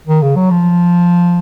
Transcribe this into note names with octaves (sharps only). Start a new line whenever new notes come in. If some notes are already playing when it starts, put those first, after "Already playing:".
D#3
C#3
F#3
F3